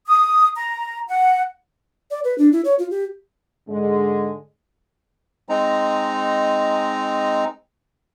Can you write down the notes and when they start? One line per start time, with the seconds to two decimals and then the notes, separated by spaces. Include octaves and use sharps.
0.07 D#6
0.56 A#5
1.09 F#5
2.11 D5
2.24 B4
2.38 D4
2.53 E4
2.65 C#5
2.79 F4
2.91 G4
3.69 G#2 D3 G#3
5.49 G#3 C4 D#4 A#5